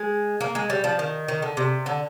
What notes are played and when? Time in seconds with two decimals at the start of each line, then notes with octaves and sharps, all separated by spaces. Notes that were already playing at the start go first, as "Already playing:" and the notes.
Already playing: G#3
0.40 A#3
0.55 G#3
0.70 G3
0.84 F3
0.99 D#3
1.28 D#3
1.42 D3
1.57 C3
1.86 D3